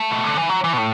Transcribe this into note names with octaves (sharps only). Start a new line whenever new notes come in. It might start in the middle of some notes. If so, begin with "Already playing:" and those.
Already playing: A3
B2
D3
E3
F#3
E3
B2
A2